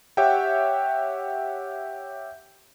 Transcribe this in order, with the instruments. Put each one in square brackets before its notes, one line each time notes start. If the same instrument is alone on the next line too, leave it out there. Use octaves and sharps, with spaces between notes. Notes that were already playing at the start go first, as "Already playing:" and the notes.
[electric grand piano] G4 C#5 E5 F#5 G5